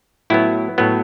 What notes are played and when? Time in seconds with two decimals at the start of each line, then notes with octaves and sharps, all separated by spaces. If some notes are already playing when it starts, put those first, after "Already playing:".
0.30 A2 F#3 B3 E4
0.78 A2 F#3 B3